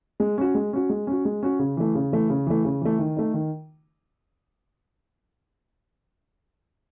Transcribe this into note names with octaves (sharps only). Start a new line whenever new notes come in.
G#3
C#4 F#4
G#3
C#4 F#4
G#3
C#4 F#4
G#3
C#4 F#4
C#3
E3 A3
C#3
E3 A3
C#3
E3 A3
C#3
E3 A3
D#3
A3 D#4
D#3